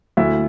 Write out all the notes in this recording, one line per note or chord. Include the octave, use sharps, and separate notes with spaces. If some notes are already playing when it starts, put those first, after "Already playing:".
D2 E4 E5